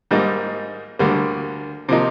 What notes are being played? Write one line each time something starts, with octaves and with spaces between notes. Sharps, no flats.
G#2 G3 A#3 D#4
D2 D3 G3 A#3
C3 F3 A#3 D#4